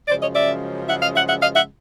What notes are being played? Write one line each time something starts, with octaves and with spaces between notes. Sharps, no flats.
F#2 C#3 F3 G#3 C5 D5
C#5 D#5
D5 E5
E5 F#5
D#5 F5
E5 F#5
E5 F#5
D#5 F5
E5 F#5